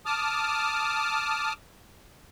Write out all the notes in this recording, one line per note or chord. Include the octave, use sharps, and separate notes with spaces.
A5 D6 D#6 F6